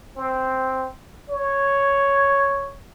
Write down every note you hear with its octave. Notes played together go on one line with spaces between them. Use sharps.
C4
C#5